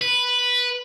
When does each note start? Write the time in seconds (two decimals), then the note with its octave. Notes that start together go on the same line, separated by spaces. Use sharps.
0.02 B4